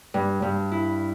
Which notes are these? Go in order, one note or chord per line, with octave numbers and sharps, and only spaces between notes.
G2
G2
E4